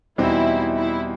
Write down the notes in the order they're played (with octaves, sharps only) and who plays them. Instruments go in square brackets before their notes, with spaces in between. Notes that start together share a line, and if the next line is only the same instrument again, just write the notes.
[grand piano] E2 B2 G3 C4 D#4 [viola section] E4
[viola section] E4